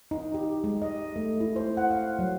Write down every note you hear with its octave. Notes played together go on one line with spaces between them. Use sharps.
D#4
G4
G#3
D#5
A3
E4
C5
F#5
F5
F#3